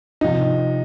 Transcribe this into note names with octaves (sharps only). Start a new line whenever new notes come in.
C3 F3 D#4